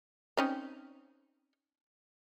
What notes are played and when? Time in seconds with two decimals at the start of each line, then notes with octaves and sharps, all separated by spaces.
0.37 C4 C#4 D#4